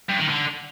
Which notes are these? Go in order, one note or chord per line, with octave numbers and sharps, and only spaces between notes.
G2
D#3
D3